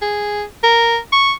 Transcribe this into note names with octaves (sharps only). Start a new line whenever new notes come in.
G#4
A#4
C#6